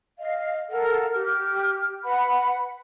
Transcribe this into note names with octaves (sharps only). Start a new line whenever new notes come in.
D#5 F5
A4 A#4 F5 F#5
G4 F6
B4 F#5 B5